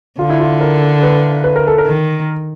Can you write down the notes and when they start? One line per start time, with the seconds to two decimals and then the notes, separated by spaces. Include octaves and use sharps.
0.19 D3 F4
0.29 E4
0.40 F4
0.61 A#4
1.03 B4
1.44 B4
1.56 A#4
1.67 A4
1.78 A#4
1.86 D#3